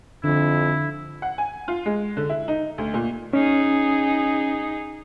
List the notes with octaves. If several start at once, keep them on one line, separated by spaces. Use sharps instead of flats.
F2 D3 D4 E4
F#5
G#5
F4
G#3
D3
E4
D#4
D2
A#2
C#4 D#4 G#4